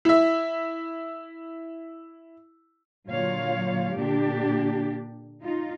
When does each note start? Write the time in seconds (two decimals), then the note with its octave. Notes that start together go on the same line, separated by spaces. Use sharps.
0.05 E4 E5
3.10 A#2 D3 F#3 F4 C#5 F5
3.94 A#2 D3 A#3 D4 G4
5.43 D#4 F4